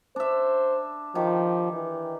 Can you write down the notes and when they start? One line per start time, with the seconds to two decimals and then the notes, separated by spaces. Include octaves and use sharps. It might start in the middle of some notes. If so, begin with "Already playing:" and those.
0.16 D4 C5 E5
1.15 D#3 F3 G4
1.73 E3